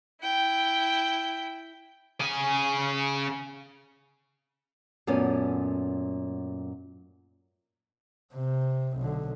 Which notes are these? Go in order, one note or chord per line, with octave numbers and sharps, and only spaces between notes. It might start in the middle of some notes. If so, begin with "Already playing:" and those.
E4 G5
C#3 G#5
F#2 A#2 A3 B3 C#4
C3
B1 D3